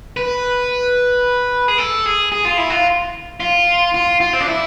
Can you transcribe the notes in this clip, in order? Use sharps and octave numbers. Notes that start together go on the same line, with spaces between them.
B4
G#4
A4
G#4
G#4
F4
E4
F4
F4
F4
F4
C4
D4
E4